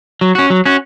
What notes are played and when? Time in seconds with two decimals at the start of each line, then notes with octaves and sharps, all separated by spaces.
0.21 F#3
0.35 C#4 F#4
0.50 F#3
0.66 C#4 F#4